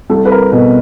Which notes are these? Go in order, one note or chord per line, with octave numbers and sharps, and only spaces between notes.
C2 A4
B4
A#4
B2 A#4